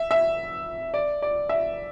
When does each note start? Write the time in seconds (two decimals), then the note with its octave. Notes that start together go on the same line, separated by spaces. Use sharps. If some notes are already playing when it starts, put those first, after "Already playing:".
Already playing: E5
0.11 E5
0.94 D5
1.22 D5
1.49 E5